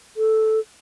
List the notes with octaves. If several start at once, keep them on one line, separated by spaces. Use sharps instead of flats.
A4